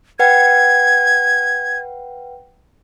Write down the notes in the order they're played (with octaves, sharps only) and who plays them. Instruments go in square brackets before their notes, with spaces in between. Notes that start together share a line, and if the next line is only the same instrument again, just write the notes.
[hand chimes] B4 F#5 G5 [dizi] G#6